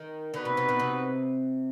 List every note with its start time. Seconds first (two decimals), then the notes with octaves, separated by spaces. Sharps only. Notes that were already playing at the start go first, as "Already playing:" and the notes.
Already playing: D#3
0.33 D3 B3 D#4 F#4 B4
0.45 C3
0.57 C3
0.69 B2
0.79 C3